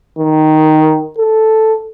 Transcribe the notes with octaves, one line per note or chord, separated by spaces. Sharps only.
D#3
A4